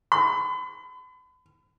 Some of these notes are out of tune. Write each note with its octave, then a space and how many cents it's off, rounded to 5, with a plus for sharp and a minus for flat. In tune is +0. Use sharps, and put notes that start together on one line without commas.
B5 +40